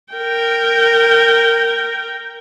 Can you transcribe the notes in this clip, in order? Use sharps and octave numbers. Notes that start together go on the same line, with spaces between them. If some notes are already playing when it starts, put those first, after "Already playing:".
A#4 G5